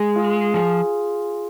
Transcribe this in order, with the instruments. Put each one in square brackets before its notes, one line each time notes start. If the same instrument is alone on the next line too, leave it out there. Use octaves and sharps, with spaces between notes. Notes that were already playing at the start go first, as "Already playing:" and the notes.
Already playing: [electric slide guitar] G#3 [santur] G#4
[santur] F4
[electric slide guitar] F3 [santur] G#4